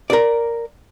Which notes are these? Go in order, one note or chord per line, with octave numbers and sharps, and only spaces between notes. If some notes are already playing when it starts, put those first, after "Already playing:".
A#4 D5